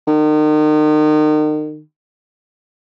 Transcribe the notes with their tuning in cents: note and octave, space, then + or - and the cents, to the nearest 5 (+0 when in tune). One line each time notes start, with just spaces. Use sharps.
D#3 -35